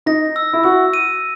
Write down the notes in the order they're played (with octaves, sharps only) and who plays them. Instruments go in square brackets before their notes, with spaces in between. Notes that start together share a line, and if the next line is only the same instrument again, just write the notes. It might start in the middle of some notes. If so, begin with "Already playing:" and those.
[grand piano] D#4 [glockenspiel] A#6
[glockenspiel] E6
[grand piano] E4
[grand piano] F#4 [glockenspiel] E6
[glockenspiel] D#7